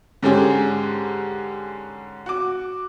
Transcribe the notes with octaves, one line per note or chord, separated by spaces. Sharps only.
G#2 D3 C#4 G4 G#4
F#4 D6